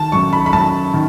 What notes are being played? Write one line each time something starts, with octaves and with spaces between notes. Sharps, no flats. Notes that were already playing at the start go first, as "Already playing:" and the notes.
Already playing: D#3 A5
F#2 C#6
B5
B5
F#2 A5
D#3